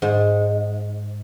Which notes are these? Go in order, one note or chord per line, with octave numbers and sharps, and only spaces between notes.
G#2